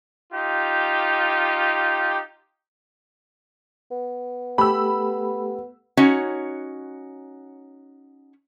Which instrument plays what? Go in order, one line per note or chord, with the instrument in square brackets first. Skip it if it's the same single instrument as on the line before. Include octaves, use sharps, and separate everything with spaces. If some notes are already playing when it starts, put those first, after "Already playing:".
[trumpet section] D#4 F4 G4
[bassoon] B3
[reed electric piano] A3 G4 A4 [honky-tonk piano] B5 E6
[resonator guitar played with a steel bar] C#4 D#4 F#4 C#5